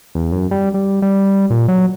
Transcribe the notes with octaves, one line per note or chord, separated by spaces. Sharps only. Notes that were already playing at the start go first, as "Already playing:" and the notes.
E2
F#2
G3
G3
G3
A#2
F#3